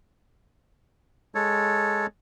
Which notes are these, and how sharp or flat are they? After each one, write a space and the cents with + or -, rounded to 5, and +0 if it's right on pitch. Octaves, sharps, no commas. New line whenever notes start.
G#3 +0 A4 +0 C#5 +0